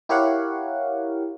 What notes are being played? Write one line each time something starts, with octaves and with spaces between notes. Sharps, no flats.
E4 G4 A#4 C#5 F5 F#5